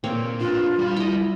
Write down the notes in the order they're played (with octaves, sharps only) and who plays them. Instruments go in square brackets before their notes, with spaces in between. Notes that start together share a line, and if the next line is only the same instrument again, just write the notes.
[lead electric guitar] A#2 [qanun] A#3 C4 C#5
[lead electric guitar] D4 B4 [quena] F4
[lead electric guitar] G3 B5
[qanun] E4 D#5